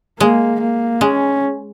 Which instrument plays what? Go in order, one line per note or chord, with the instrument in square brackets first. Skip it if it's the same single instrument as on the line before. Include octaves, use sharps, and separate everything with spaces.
[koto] G#3 [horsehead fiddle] A#3
[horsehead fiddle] A#3
[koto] G#3 [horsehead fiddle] C#4